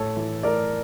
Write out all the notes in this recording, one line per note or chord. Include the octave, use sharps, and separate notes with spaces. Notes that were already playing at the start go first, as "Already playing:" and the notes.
Already playing: A2 A4 C#5
E3
A2 A#4 D5